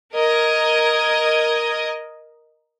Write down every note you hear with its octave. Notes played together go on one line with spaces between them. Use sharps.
A#4 D#5 G#6